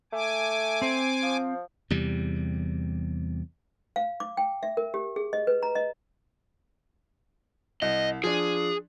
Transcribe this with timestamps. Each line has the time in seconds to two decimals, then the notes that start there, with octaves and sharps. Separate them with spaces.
0.13 A3 G#5 D6
0.82 C4 C5
1.22 F3
1.90 E2 C3 G3
3.96 F5
4.20 D6
4.37 G5
4.63 E5
4.77 A#4
4.94 G4
5.16 G#4
5.33 D#5
5.47 B4
5.63 A#5
5.75 D#5
7.82 C2 D#5
8.24 F3 D4 G#4